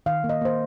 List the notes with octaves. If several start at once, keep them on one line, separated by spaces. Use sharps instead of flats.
D#3 F5
A#3
D#5
A#3 C5